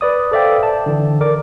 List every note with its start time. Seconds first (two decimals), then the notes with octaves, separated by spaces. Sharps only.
0.01 B4 D5 D#6
0.32 A4 C5 D5 E5 F5 G5
0.63 A5
0.86 D3 E3 D4
1.21 A#4 D5 D6